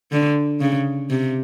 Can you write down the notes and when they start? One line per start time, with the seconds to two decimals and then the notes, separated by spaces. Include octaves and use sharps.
0.11 D3
0.61 C#3
1.10 C3